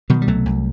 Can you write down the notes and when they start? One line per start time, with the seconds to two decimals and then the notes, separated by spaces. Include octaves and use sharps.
0.10 B2 D#3 F#3
0.22 G3
0.27 C2 F#3 A3
0.46 C2